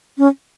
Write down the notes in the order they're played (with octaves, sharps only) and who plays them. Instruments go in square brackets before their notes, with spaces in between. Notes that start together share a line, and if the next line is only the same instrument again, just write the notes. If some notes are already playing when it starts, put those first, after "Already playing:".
[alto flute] C#4